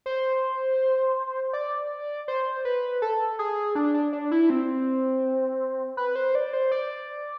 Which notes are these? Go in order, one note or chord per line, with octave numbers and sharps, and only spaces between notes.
C5
D5
C5
B4
A4
G#4
D4
D4
D4
E4
C4
B4
C5
D5
C5
D5